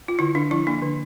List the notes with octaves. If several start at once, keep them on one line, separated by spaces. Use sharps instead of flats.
F4
D3 E4
D3 D4
F3 E4
A#3 D4
D3